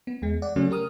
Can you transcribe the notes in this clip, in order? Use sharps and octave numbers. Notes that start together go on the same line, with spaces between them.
B3
E2 G#3
D5 F#5
C#3 F#3 A3 C#4
G4 A#4 D#6 F6